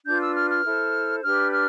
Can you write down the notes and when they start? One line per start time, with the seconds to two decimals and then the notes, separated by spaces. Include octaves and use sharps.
0.06 D4 F4 B4 G6
0.22 E6
0.35 F6
0.50 F6
0.65 E4 A4 C5
1.23 D4 G4 B4 F6
1.52 F6